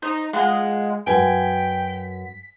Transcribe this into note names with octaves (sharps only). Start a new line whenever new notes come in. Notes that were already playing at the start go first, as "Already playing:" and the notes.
D#4 C5
G#3 F4 F#5
F#2 F#4 B4 G5 G#5 B6